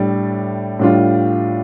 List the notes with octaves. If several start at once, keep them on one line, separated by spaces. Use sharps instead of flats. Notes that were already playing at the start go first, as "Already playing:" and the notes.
Already playing: A2 G3 D4 A4
A2 G3 D4 F4